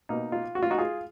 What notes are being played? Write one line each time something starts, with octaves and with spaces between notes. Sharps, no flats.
B2 A#3 D#4
F4
F#4
F4
D#4 F#4
F4 G#4